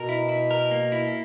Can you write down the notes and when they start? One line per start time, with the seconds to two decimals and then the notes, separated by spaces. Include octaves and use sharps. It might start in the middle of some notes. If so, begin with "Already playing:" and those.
Already playing: B2 A#4
0.09 E4
0.29 E4
0.51 A#4
0.71 A#3
0.92 E4